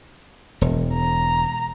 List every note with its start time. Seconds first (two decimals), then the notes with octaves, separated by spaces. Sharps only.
0.61 E1
0.94 A#5